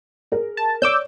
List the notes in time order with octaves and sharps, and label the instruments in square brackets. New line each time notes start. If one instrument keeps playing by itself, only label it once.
[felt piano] G#4 A#4
[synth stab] A5
[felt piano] C#5 D5 [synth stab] D6 E6 G6